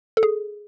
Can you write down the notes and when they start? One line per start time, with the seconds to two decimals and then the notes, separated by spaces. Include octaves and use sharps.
0.17 A4
0.23 G#4